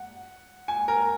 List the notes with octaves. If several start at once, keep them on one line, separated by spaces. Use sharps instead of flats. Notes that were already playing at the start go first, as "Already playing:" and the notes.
Already playing: F#5
G#5
A#4